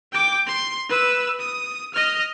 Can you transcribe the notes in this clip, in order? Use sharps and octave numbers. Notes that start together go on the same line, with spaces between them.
G5 D6
C6
B4 E6
D#6
D#5 F6